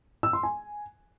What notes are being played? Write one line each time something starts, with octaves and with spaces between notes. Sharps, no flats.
E6
C6
G#5